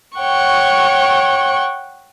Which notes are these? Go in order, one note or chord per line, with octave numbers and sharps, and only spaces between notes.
C#5 F#5 G5 C#6